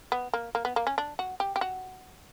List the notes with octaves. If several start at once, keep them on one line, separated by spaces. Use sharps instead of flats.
B3
A#3
A#3
B3
A#3
C#4
D4
F#4
G4
G4
F#4